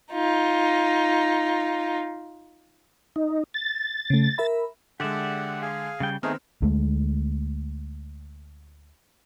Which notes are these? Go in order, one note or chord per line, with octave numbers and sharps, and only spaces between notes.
D#4 F4
D#4
A6
C#3 A3
A#4 E5 B5
D3 G#3 G4 D5 E5 F#5
G#4 F5 G#5
C#3 G3 G5
D#3 A3 B3 C4 D#4 G#4 F6
D2 G#3 A3